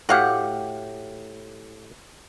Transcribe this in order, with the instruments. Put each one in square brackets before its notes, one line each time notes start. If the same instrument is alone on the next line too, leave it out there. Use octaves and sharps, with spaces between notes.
[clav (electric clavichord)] A2 G4 [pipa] F#4 F5 F#5